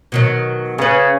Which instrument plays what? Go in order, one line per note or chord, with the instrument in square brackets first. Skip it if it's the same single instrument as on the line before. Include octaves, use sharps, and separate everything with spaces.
[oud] B2 D#3 F#3
[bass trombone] C#3 [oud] C#4 B4